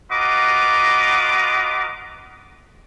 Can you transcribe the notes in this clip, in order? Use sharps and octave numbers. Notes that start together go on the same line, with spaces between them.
F4 F#4 B4 D#5 A#5 D6